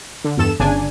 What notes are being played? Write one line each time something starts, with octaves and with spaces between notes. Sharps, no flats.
D3
E2 G2 A4 E7
G1 C#3 D4 G#5